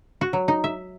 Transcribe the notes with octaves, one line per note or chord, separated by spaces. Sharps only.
F#4
F#3
D#4
E5